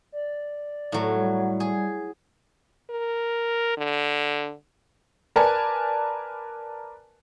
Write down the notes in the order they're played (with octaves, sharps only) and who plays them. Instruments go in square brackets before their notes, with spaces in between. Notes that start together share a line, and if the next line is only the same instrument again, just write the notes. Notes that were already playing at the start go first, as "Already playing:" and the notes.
[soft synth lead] D5
[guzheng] A2 F#3
[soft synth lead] G3
[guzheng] G#4
[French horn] A#4
D3
[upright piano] A#4 B4 D5 G#5 A5